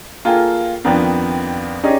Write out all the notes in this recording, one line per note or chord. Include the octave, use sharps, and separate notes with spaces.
A#3 F4 G#4 A4 G5 G#5
F2 D#3 F3 B3 C4 D4
C#4 D#4 G4 G#4 D5 D#5